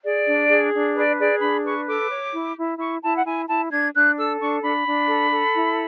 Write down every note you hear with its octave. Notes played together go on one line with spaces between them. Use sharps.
G#4 D5
D4
G#4
D4
B4 D5
G#4 D5
D4 B5
B4 C#6
A4 D6
C#5
E4
E4
E4 C#6
E4 A5
F#5
E4 G#5
E4 A5
D4 G#6
D4 F#6
A4 E6
D4 C#6
D4 B5
D4
A4
A4
E4